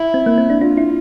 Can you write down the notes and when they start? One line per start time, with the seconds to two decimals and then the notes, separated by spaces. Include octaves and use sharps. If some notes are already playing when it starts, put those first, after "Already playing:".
Already playing: E4
0.14 C4
0.26 A#3
0.38 C4
0.50 D4
0.61 D4 F4
0.77 E4